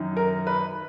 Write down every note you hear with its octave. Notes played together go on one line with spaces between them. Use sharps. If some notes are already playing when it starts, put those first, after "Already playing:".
Already playing: F#2 D#3
A#4
B4